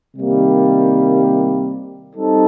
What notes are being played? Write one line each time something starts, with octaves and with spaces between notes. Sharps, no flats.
C3 D#3 G3 A#3
G3 C4 D#4 A4